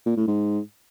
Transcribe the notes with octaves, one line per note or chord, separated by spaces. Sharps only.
A#2
A2
G#2